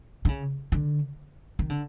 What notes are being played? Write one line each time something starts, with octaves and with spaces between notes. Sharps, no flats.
D3
C#3
D3
D#3
D3